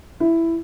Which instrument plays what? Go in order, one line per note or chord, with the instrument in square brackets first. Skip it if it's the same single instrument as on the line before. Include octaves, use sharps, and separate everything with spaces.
[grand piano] E4